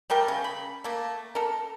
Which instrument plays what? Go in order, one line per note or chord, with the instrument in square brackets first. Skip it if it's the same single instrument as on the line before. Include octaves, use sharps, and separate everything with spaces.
[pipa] G3 A3 A#4 G5
C#3
B5
A3 A#3
A4 A#4